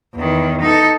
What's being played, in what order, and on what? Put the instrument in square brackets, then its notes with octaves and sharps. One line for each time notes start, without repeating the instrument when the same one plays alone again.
[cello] E2 D#3
D#4 A4